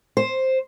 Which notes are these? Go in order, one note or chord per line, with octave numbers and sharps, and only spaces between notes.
C5